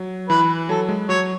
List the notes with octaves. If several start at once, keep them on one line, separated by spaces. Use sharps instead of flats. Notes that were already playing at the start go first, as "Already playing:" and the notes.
Already playing: F#3
E3 B4
F#3 A4
G#3
F#3 C#5